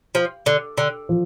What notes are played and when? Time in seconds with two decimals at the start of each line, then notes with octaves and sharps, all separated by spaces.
0.15 F3
0.46 D3
0.78 D3
1.09 F3